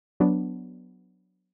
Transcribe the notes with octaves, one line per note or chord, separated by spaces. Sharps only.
F#3 B3 D4